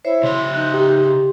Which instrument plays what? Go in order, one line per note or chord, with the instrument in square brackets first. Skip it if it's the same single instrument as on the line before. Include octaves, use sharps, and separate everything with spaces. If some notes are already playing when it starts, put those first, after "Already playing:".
[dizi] E4 [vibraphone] C5 C#5 E5
[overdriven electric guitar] C#3 E5 [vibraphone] C6
[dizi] D#4 [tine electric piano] F#6
[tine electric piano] G4